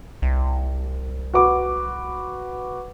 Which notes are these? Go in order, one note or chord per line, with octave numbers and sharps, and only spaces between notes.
C2
F#4 B4 D6